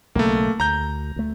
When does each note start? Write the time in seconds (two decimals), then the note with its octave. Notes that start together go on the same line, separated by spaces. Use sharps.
0.15 B1 C#3 A3 A#3
0.60 D2 A#5 G6
1.16 D2 A3